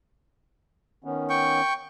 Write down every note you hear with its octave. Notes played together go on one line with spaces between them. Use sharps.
D#3 B3 C#4
G5 C#6